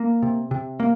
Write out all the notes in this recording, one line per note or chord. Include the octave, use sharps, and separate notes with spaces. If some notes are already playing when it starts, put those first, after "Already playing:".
Already playing: A#3
C3
C3
A#3